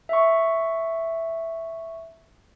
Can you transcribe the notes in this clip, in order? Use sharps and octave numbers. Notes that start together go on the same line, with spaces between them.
E5 C#6